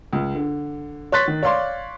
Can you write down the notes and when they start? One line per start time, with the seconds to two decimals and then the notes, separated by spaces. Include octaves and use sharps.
0.13 C#2
0.35 D3
1.12 C#5 C6 F#6 A6 B6
1.28 D#3
1.43 C#5 D5 F5 C6